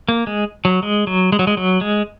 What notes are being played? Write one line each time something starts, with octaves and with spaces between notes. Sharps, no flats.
A#3
G#3
F#3
G#3
F#3
G#3
F#3
G#3
F#3
G#3